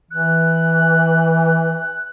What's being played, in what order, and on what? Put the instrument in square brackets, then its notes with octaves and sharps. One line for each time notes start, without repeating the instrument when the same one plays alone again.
[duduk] E3 [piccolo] F#6